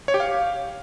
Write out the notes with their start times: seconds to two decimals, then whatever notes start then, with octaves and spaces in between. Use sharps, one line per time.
0.08 C#5
0.14 G4
0.20 F5